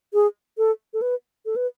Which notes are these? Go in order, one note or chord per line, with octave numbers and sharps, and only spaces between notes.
G#4
A4
A4
B4
A4
B4